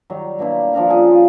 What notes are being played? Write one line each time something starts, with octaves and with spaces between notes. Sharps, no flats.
D#3 F#3 G3
B2 A#3 D4 E4
F3 D4 A#4 F5
C#3 G#4 A4
F4